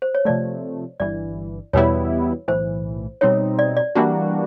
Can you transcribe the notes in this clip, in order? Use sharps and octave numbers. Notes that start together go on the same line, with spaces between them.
C5
C#5
C3 F3 A3 D5
G1 G2 E3 D5
E2 B2 G3 B3 E4 C#5
B1 A2 E3 C5
B2 G3 C4 D#4 C#5
D5
D5
E3 G3 A#3 D4 F#4